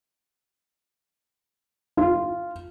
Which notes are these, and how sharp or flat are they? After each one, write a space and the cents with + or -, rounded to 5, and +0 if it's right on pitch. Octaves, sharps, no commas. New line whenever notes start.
F4 -10